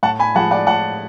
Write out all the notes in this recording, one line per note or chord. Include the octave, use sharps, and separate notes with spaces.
A2 F#5 A5
G#5 B5
F3 G#3 F#5 A5
D5 F#5
A2 F#5 A5